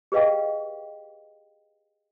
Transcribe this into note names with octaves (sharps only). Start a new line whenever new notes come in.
G4 G#4 B4 D#5 F5 G5